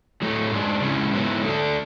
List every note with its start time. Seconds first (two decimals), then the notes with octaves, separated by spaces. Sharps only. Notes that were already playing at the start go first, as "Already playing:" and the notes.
0.22 A2 F#3 A3
0.52 G#2 G#3 D4
0.83 C#3 G#3 C#4 E4
1.14 G#2 F#3 B3 E4
1.44 D3 A3 D4